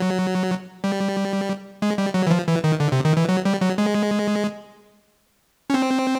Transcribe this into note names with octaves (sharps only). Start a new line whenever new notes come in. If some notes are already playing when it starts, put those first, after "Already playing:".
Already playing: F#3
G3
G#3
G3
F#3
E3
F3
E3
D#3
D3
C3
D#3
E3
F#3
G3
F#3
G#3
C#4
C4